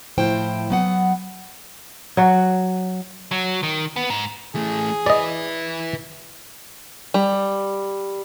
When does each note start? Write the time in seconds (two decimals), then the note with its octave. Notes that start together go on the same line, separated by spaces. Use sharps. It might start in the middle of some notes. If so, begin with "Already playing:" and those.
0.18 A2 F3 E4 C5 G5
0.70 F#3 B3 F#5
2.17 F#3 F#4
3.31 F#3
3.63 D#3
3.96 B3
4.10 G#2
4.55 E3 A3 G#4
5.06 E4 B4 D5 D#5
7.14 G3